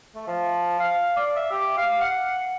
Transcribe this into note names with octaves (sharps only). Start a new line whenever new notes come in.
A3
F3
F5
D5
E5
G4
F5
F#5